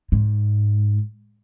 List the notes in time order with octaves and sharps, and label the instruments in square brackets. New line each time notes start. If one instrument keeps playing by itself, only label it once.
[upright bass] G#2